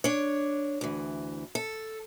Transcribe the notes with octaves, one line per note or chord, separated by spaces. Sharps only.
D4 C#5
D2 E3
A4